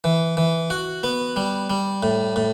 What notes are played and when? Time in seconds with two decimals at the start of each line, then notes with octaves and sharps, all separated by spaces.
0.04 E3
0.37 E3
0.70 F#4
1.03 B3
1.36 G3
1.70 G3
2.03 A2
2.36 A2